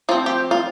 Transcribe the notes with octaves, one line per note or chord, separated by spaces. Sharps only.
F3 C4 F4
G4
F4